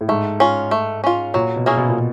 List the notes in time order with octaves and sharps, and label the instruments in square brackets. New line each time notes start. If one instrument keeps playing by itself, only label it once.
[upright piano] A2
[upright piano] G#2 [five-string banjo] A3
[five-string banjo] C#4 F4
A3
C#4 F4
[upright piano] A#2 [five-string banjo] F#3
[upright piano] B2
[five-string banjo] A#3 C#4 E4 G#4
[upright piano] B2
A#2
B2